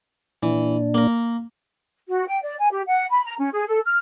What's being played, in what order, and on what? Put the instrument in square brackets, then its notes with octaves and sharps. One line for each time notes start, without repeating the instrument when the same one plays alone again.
[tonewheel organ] A#2 D4 [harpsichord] E3
[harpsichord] A#3 A#4
[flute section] F#4
G5
D5
G#5
G4
F#5
B5
A#5
C#4
G#4
A4
F6